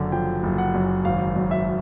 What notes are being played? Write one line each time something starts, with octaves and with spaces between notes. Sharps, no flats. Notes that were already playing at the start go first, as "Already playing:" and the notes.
Already playing: F#1 F#2 D3
F3 G5
F#1
F#5
F#2
G#1 F5
F#2
E5